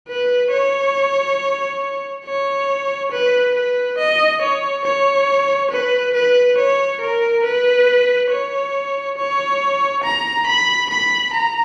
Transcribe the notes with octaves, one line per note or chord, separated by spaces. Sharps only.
B4
C#5
C#5
B4
B4
D#5
C#5
C#5
B4
B4
C#5
A#4
B4
C#5
C#5
A#5
B5
B5
A#5